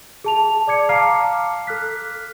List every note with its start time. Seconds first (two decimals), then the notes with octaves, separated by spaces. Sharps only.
0.24 G#4 A5 F7
0.67 D5 D6 G#6 C#7
0.89 F5 A5 A#5 D6 F6 C7
1.24 D6
1.67 A4 F6 F#6 B6